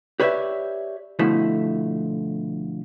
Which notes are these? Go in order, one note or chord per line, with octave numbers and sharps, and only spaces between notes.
G4 B4 C#5 D5 E5
B2 D3 F3 A3 E4